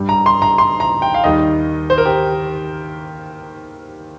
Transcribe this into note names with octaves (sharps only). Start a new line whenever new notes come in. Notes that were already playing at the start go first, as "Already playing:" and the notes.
Already playing: G2 G3
A#5
C6
A#5
C6
A#5
G5
F5
D#2 D#3 G3 D#5
C5
A#4
G4